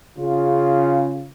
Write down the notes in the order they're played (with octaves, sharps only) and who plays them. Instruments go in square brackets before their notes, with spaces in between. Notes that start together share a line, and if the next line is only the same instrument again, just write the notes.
[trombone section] C#3 F4